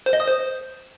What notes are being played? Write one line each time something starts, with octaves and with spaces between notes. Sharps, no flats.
C5
D#5
D#6
C5